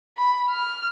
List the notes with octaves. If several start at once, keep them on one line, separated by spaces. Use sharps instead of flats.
B5
F6